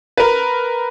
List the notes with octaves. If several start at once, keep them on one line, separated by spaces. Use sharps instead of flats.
A#4 B4